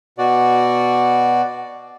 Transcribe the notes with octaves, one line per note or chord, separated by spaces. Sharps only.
B2 F#4 D5